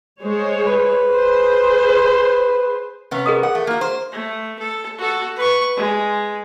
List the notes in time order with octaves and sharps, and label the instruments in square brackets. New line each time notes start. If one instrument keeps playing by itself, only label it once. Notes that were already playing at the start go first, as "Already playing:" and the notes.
[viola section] G#3 C5 C#5
[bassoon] B4
[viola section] G#4 C5
[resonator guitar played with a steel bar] C3 B3 C#4
[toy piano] G#4 A#4 D#6
[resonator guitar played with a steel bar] F#5
A3
A#3 F#4
C5
[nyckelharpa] A3
A4
F#4 A4
B4 C#6
G#3